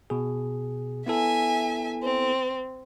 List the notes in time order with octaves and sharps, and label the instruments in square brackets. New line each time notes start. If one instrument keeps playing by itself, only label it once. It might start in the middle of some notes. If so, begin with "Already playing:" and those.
[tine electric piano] B2 G#4
[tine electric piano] B3 E4 A4 [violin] E5 G#5
[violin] C4